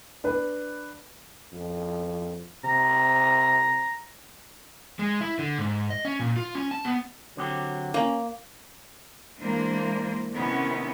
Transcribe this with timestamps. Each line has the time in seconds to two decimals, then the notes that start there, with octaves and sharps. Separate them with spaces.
0.24 D4 B4
1.52 F2
2.64 C3 A#5
4.99 G#3
5.21 E4
5.39 D3
5.58 G#2
5.90 D#5
6.05 C#4
6.20 A#2
6.37 F4
6.55 C#4
6.71 A5
6.85 B3
7.37 D3 F#3 C4 G4
7.94 A#3 C#4
9.38 E3 G#3 A#3 D4 C5
10.34 C3 D#3 B3 C#4 D4 E4